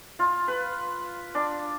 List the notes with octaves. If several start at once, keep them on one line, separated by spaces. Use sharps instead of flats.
F4
B4
D4